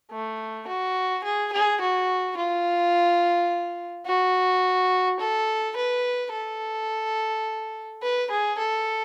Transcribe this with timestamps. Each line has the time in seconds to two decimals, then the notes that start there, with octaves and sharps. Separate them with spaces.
0.11 A3
0.68 F#4
1.24 G#4
1.53 G#4
1.81 F#4
2.37 F4
4.06 F#4
5.20 A4
5.76 B4
6.32 A4
8.02 B4
8.31 G#4
8.58 A4